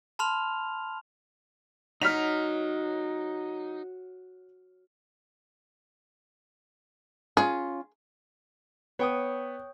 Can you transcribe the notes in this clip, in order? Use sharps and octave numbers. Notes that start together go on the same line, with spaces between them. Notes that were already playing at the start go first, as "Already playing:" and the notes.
A5 B5 C6 F6 F7
F#3 D#4 F6 B6 F7
C#4 F4 G#4
B3 C#5 G5 D#6